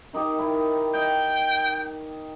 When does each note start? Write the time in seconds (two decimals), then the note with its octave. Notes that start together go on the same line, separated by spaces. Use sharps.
0.13 D#3 D#4 G4
0.38 D#3 D#4 E4
0.94 D#5 G5